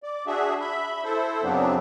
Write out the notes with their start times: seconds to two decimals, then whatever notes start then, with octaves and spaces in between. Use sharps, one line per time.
0.03 D5
0.27 D4 F#4 G#4 E5
0.61 E5 B5
1.04 E4 A4 C5
1.44 F#2 C#3 F#3 B3 C4 D4